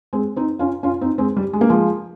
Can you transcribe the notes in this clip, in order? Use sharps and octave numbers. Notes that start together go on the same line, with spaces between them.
G#3 C4
C4 D#4
C#4 F4
C#4 F4
C4 D#4
G#3 C4
G3
G#3
A#3
F3 G#3